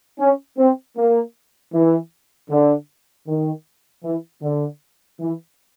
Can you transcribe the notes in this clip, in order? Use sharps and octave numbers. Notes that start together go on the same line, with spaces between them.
C#4
C4
A#3
E3
D3
D#3
E3
D3
E3